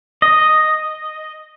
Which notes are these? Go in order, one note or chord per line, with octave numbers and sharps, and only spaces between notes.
D#5